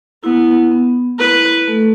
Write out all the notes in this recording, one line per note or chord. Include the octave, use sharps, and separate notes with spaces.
B3 E4
B3
E4 B4
A3 A4